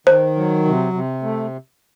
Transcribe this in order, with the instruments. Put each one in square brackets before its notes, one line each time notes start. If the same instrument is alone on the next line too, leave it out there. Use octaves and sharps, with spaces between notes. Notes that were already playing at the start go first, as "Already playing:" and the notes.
[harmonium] D#3 [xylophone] C5
[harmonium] F#3
C3
C3
A3